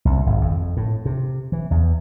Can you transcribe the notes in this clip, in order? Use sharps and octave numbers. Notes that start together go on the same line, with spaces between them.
C2
G#1
F2
A2
C3
E3
E2